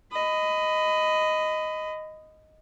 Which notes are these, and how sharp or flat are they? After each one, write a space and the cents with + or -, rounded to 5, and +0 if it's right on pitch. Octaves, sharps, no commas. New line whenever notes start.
D#5 +0 B5 +25